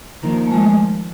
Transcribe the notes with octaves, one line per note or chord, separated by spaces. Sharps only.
D#3 F3 A#3
A#3
A3
D#3 F3 G#3